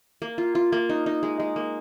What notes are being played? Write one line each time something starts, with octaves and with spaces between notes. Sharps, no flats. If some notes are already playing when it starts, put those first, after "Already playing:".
A#3
F4
F4
A#3
D#4
D#4
G#3
G#3
A#3